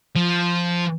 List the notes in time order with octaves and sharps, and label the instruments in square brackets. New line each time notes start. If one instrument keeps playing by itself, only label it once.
[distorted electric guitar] F3